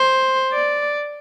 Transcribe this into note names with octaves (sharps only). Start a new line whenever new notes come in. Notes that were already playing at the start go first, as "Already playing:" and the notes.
Already playing: C5
D5